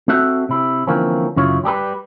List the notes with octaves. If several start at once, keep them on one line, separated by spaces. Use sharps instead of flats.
C4 F#4 A4 E5 F#5
C3 E4
D3 E3 F3 A#3 C4 C#4
F#2 C#3 E4 F4 C#5
G3 G4 G#4 B4